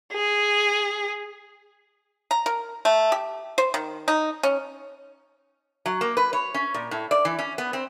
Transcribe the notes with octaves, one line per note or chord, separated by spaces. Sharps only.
G#4
A#5
A#4
A3
G4
C5
D#3
D#4
C#4
F#3
A#3
B4
C#5
C#4
A#2
A2
D5
E3
C#4
B3
C4